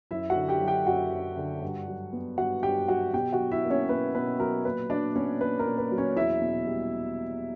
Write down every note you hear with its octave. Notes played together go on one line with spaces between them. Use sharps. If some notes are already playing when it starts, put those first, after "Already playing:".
F#2 E4 E5
F#4 F#5
D3
G4 G5
F#3
G4 G5
F#2 F#4 F#5
F#2
D3
G2
F#3
B3
G2 F#4 F#5
G2 G4 G5
F#3 F#4 F#5
B2 G4 G5
F#4 F#5
F#3
E4 E5
A#3
C#4 C#5
B2 B4
B2 B4
F#3 A#4
A#2 B4
F#3 D4 D5
B3 C#4 C#5
A#2 B4
A#4
A#2
B4
F#3
C#4 C#5
E2 E4 E5
B2
G3